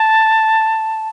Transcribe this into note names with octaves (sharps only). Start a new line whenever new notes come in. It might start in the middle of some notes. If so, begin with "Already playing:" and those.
Already playing: A5